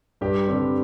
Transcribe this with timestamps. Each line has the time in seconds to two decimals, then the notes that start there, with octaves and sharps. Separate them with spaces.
0.21 G2 G4
0.47 D3 G3 C4